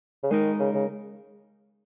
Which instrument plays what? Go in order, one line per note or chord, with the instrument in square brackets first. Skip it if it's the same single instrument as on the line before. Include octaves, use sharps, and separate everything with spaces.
[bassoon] C#3
[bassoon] D#3 [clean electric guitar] G#3 D#4 A#4
[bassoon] C#3
C#3